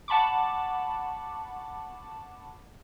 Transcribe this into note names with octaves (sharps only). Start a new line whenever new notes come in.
F#5 A5 B5 C#6 D6